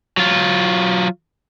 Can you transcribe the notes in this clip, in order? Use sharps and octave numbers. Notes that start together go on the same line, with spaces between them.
F#3 F4